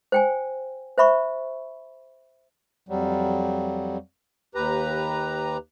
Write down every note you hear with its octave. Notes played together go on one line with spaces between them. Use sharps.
C5 G5 G#5
C5 E5 B5 C#6
F2 F#3 G3
D#2 G4 B4 A#5